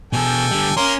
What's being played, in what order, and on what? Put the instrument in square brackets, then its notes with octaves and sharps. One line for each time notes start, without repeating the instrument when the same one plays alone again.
[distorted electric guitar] B2 G#4 [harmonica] A4 G5 G#5
[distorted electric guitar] D3 G3
[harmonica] A#3 A#4 C6 [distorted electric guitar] C#4